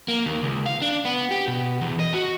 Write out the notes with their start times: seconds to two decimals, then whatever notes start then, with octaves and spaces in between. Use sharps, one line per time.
0.08 A#3
0.26 D#2
0.43 C#2
0.66 F5
0.82 D4
1.05 B3
1.31 G4
1.48 B2
1.81 E2
2.00 D#5
2.14 F#4